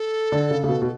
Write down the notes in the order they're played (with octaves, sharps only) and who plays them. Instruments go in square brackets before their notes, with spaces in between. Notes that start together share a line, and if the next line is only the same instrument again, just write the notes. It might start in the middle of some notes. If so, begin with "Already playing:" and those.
Already playing: [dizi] A4
[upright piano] D3
C#3
C#3
B2
B2